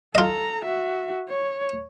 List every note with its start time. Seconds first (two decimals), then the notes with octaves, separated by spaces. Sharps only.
0.15 F4 A4 D#5 A#5
0.64 F#4 E5
1.29 C#5